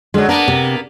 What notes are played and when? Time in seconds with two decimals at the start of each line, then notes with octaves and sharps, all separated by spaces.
0.14 D3 F#3 G#3
0.29 A#3 B3 D4 A#4
0.48 C3